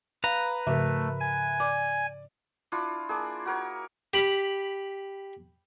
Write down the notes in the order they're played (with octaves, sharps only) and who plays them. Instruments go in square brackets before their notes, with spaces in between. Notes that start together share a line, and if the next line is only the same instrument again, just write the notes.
[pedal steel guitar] B4 A#5 [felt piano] F5
[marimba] G#2 C#3 F3 [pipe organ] A3 [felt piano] A#4 E5
[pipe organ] G#5
[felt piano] D5 [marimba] D6
[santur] D4 E4 F4
A#3 D4 G#4
F#4 A#4 C#5
[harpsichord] G4 B5